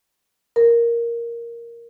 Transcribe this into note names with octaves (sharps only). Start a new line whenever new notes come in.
A#4